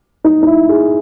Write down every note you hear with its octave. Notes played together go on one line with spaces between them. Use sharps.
D#4
D#4
E4
G#4